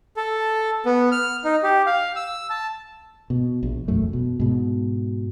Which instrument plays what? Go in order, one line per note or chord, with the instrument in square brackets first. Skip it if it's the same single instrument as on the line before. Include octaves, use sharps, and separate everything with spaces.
[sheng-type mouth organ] A4
B3
F6
D#4
G4
F5
E6
A5
[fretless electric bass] B2
A#1
E1 F#2 A3
B2
G#2 B2